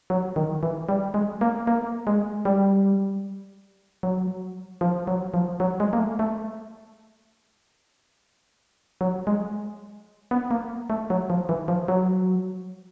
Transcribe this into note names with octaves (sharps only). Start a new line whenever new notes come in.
F#3
D#3
E3
G3
G#3
A#3
A#3
G#3
G3
F#3
F3
F#3
F3
F#3
G#3
A#3
A3
A3
F#3
G#3
B3
A#3
A3
F#3
F3
E3
F3
F#3